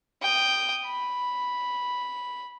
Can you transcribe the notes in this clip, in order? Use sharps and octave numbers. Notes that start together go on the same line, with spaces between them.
G5 D#6
B5